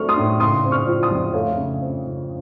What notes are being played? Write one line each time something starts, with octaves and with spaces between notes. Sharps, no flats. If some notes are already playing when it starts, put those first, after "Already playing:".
Already playing: F#3 A3 C4 C#6 F6
C6 D#6
A2
C#3 C6 D#6
C4
C#6 F6
F3
C6 D#6
F2
A3 C#5 F5
C#3
C4
C#3